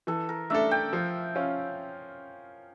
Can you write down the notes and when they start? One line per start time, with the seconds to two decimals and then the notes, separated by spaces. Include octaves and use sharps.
0.07 E3 A4
0.29 A#4
0.50 A3 D4 A4 E5
0.71 G5
0.93 F3
1.35 C#4 F4